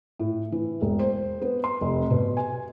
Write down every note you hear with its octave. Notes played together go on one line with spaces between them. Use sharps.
A2
E3
E1
C5
B3
C6
F1
B2
G#5